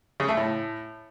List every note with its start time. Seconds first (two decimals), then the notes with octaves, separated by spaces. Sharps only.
0.20 C#3
0.28 A3
0.37 A2